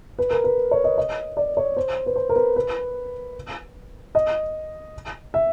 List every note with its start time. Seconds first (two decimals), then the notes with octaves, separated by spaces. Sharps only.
0.19 B4
0.31 A#4
0.44 B4
0.71 C#5
0.84 D#5
0.98 D#5
1.37 D5
1.57 C#5
1.77 C5
2.06 B4
2.16 C5
2.29 A#4
2.36 B4
2.56 B4
4.15 D#5
5.34 E5